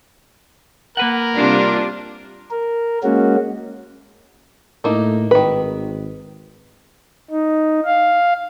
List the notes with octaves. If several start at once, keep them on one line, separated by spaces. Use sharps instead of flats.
A#3 A#4 B4 F#5
C3 G3 D4 F4
A#4
G#3 A#3 C#4 F#4
A2 A3 A#3 D#4
G#1 D#3 B4
D#4
F5